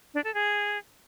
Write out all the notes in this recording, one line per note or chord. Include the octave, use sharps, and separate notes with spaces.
D4
A4
G#4